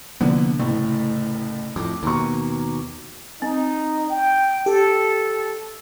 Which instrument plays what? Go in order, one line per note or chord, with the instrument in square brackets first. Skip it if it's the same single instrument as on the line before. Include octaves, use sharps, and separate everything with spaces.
[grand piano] C2 D3 [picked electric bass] F3 A#3 B3
[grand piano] F#1 C2 A2 [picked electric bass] A3
[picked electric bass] F2 A2 [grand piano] D6
[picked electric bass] D#2 B2 [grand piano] A#4 A#5 C#6
[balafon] C4 [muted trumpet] D#4
[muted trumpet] G5
[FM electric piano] G4 [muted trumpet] A4